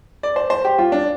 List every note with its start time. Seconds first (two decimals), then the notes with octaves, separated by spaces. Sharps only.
0.23 D5
0.36 C5
0.50 C5
0.65 G4
0.79 F4
0.92 D4